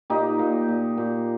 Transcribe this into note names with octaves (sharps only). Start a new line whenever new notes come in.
A#2 D#4 G4
A#2
A#2
A#2